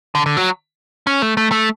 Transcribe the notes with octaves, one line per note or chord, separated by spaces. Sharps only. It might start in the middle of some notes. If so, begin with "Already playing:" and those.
D3
D3
F#3
C#4
A3
A3
A3